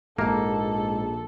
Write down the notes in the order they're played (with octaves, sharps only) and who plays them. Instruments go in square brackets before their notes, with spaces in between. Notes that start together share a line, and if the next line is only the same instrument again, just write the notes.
[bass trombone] A#1 [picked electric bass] G#2 [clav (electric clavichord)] A#3 [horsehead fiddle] A4